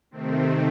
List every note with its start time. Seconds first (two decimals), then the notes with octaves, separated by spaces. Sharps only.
0.11 C3 D#3 A3 C4